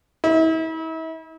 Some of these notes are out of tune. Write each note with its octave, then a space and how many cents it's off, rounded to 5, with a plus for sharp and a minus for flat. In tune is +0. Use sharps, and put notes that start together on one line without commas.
E4 -40